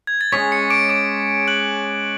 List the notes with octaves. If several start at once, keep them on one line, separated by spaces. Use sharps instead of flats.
G#6
A6
G#3 C#4 G#4 C#5 B6
C#6 C#7
D6 D7
D6 D7
F#6 F#7